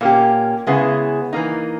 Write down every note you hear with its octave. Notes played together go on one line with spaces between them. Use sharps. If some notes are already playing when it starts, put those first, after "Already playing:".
A#2 A#3 C#4 G4
C#3 G#3 B3 E4 G#4
E3 A#3 D#4